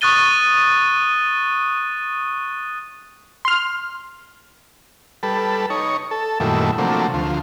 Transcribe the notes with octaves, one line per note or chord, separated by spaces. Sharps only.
C#6 D#6 F#6 A6 D#7 G7
C6 F6
G3 A4 B4
D#4 C#5
A4
F#2 A#2 D#3 G3 A3 E4
C3 F3 F#3 A3 A#3 D4
D2 F3